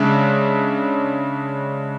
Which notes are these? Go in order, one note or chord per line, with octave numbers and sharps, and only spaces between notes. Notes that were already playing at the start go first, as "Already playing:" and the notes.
Already playing: C#3 G#3 D4 E5